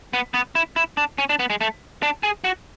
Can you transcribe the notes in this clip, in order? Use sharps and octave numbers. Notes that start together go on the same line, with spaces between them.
B3
B3
E4
E4
D4
C#4
D4
B3
G#3
A3
D4
G#4
F#4